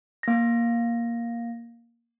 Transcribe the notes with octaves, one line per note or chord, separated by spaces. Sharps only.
A#3 A#6